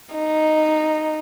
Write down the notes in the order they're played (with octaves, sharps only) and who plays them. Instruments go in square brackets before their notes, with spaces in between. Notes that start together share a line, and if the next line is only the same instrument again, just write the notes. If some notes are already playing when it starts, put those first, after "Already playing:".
[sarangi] D#4